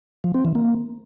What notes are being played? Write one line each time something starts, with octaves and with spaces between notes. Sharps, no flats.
F3
C4
E3
A#3